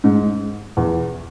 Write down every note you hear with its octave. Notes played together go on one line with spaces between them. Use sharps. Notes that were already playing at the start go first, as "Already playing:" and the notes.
G#2
E2